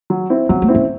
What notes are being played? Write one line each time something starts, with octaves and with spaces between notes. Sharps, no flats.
F#3
C4 E4
F#3 C4
A3
C4 E4
C#4